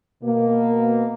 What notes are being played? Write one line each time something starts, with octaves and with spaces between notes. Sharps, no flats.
B2 A#3